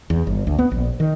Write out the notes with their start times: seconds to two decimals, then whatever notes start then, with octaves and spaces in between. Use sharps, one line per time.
0.10 E2
0.27 G1
0.47 D2
0.59 B3
0.71 A#1
1.00 D#3